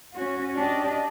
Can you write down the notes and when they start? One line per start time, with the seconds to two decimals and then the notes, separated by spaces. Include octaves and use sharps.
0.13 C#4 F#4
0.56 D4 G4 D#5